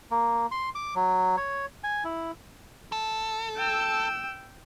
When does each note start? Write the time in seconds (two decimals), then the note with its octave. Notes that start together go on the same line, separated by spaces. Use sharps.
0.11 A#3
0.51 C6
0.75 D6
0.95 F#3
1.37 C#5
1.84 G#5
2.04 E4
2.92 A4
3.57 G5 E6